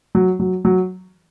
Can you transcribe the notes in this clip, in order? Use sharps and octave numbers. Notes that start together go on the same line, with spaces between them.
F#3
F#3
F#3